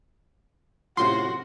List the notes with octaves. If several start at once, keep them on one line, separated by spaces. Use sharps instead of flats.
F#2 A2 C3 F4 F#4 C6